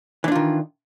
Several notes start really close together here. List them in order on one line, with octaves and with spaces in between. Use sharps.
E3 D4 F4 D#3